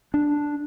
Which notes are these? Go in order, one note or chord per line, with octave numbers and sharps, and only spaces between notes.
D4